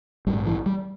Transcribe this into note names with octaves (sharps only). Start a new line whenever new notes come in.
A#1 G#2 G3
E3
G3